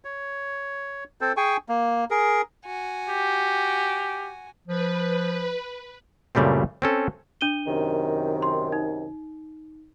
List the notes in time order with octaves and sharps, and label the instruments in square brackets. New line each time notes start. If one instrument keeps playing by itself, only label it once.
[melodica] C#5
C4 A4 C5
G#4 G5 G#5 C#6
A#3
G#4 A#4
[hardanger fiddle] F#4 G#5
[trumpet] G4
[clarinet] F3 [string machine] B4
[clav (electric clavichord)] F#2 A#2 C#3 G3 A3 C4
C4 C#4 A4
[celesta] D4 D#7 G7
[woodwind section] F#2 C3 D#3
[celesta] C6
D#4